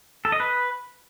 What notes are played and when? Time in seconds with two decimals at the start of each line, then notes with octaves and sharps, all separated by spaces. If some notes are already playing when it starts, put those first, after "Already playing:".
0.25 A4
0.32 D#5
0.40 B4